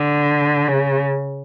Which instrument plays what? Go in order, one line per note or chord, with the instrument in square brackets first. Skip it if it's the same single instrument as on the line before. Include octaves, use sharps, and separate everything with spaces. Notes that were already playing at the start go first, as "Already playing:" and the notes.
Already playing: [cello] D3
C#3